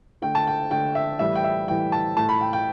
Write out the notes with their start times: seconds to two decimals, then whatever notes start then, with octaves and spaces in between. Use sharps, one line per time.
0.22 D3 A3 G5
0.35 A5
0.47 G5
0.70 D3 A3 G5
0.95 E5
1.19 A2 E3 G3 E5
1.35 G5
1.44 E5
1.68 A2 E3 G3 G5
1.92 A5
2.17 A2 A3 A5
2.29 B5
2.41 G5
2.53 G5